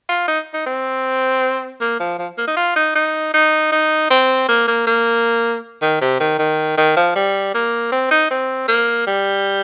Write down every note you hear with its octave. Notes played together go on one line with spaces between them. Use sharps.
F4
D#4
D#4
C4
A#3
F3
F3
A#3
D#4
F4
D#4
D#4
D#4
D#4
C4
A#3
A#3
A#3
D#3
C3
D#3
D#3
D#3
F3
G3
A#3
C4
D#4
C4
A#3
G3